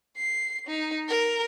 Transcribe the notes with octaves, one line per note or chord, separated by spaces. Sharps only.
C7
D#4
A#4